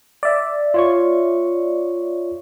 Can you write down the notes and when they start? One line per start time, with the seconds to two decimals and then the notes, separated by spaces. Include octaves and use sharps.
0.23 D5 E5
0.74 F4 C#5 C#6